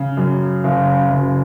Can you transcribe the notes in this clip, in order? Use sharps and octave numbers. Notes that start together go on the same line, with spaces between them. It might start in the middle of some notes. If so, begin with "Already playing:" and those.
Already playing: C#3
F#2
F#1
F#1